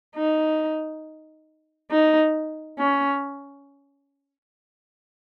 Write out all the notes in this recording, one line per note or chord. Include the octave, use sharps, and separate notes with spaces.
D#4
D#4
C#4